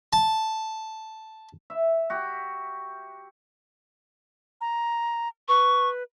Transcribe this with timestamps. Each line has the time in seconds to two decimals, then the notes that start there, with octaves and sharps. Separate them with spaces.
0.13 A5
1.70 E5
2.10 F#4 G4
4.61 A#5
5.48 B4 C#6